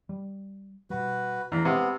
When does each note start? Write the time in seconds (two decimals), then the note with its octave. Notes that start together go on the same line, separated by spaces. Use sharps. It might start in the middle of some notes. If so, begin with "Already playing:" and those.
0.09 G3
0.90 B2 G3 F#4 B4
1.52 E2 E3 A3 C#4 A#5
1.65 C3 G#3 B3